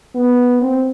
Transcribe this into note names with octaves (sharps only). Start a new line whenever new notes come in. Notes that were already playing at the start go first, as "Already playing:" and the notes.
B3
C4